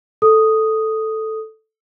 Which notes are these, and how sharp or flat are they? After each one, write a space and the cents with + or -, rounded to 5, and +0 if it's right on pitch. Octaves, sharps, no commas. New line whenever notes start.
A4 +0 D#6 +0